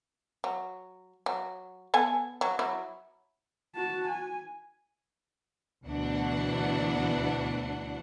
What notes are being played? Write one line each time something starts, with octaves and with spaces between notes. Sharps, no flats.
F#3
F#3
B3 A4 G#5
F#3
F#3 E4
F#4 A5
G#5
D2 B2 E3 D4 F#5